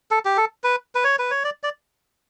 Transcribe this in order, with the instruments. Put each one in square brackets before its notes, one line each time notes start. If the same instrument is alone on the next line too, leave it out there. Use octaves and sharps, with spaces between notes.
[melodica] A4
G4
A4
B4
B4
C#5
B4
C#5
D5
D5